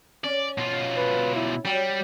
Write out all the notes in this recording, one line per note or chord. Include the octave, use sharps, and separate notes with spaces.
C#4 D5
B2 F4
B4
E4
F#3 G3 G5